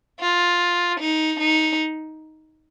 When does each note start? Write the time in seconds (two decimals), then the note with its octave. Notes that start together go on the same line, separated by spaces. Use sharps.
0.20 F4
1.00 D#4
1.40 D#4